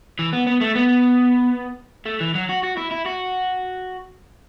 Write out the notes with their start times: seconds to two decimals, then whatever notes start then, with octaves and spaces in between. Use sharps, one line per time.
0.19 E3
0.33 B3
0.47 B3
0.61 A3
0.75 B3
2.05 A3
2.21 E3
2.35 F#3
2.49 F#4
2.64 F#4
2.78 E4
2.92 E4
3.06 F#4